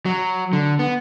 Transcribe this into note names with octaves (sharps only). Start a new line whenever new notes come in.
F#3
D3
B3